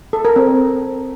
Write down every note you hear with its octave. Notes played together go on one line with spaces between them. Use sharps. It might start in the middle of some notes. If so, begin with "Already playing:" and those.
A4
A#4
C4